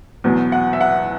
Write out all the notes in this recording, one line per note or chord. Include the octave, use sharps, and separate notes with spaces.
E2 B2 F#3
F#5
E5
F#5